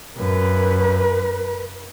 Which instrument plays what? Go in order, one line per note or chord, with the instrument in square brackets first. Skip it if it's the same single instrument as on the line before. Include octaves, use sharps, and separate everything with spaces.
[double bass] F#2 [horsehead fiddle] A#4 B4